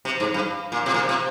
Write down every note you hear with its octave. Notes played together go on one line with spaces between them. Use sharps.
C3
G#2
G2
A#2
C3
A#2
C3